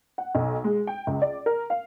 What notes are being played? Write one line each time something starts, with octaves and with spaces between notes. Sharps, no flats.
F#5
B1
G#3
G5
C#2
D5
A#4
F5